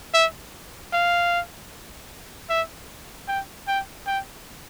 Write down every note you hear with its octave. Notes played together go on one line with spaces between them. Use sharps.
E5
F5
E5
G5
G5
G5